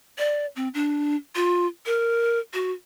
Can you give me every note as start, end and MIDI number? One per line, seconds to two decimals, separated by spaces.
0.18 0.46 74
0.56 0.68 60
0.74 1.16 62
1.35 1.67 65
1.86 2.39 70
2.54 2.72 66